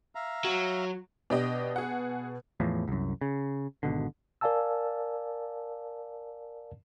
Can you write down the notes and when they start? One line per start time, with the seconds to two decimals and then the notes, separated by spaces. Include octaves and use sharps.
0.15 E5 F5 A#5
0.45 F#3
1.30 B2 D4 G4 D#5
1.76 G#4 F#5
2.60 E2 A2 F3
2.88 C2 F#2
3.21 C#3
3.83 G#1 B2 D3
4.41 A#4 D5 F5 G#5 A5 E6